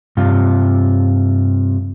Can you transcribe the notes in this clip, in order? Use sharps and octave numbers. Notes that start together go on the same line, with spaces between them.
G2 C3 F4